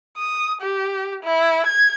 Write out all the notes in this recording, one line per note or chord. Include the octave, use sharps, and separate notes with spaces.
D#6
G4
E4
G#6